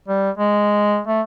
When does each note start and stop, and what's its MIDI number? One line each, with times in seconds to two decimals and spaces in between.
0.08 0.30 55
0.38 1.00 56
1.07 1.21 57